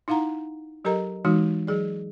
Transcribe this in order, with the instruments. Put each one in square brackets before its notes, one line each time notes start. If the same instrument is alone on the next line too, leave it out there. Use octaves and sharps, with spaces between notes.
[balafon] D#4 E4 F5 F#5 A#5
F#3 G4 A4 A#4 D#5 A#5
E3 G#3 D#4 F#4
F#3 G#4 D5